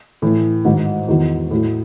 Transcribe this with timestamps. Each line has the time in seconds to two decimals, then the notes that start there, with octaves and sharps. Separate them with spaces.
0.22 A2 E3
0.65 G#2 D#3 F#3
1.08 E2 D#3 F#3
1.51 A2 F#3